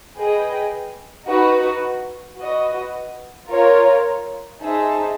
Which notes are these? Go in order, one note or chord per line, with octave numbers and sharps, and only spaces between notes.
G#4 B4 D#5 G5
D#4 F#4 B4
F#4 B4 D#5
F4 A#4 C#5
D#4 G#4 C5 E5 A5